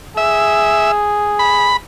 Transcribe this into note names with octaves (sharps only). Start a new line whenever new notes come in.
G#4 E5
B5